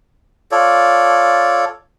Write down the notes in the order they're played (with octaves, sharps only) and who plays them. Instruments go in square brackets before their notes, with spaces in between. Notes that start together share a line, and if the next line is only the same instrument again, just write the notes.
[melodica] F4 A4 C#5 D5